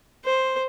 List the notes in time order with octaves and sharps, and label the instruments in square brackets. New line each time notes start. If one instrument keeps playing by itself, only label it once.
[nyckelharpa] C5